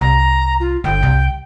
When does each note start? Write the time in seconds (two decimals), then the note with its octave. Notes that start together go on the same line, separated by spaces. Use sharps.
0.01 C2 A#5
0.60 F4
0.84 G1 G5
1.03 C2